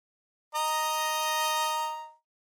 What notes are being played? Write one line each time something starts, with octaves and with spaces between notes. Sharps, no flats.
D#5 A#5